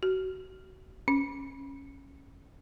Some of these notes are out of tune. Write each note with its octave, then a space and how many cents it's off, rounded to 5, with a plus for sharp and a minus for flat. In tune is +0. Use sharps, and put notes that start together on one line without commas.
F#4 +25
C#4 -10